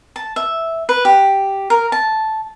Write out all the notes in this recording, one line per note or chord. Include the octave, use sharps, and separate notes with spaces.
A5
E5
B4
G4
A#4
A5